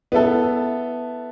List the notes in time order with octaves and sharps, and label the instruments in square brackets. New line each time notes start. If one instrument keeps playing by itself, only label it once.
[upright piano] B3 E4 A4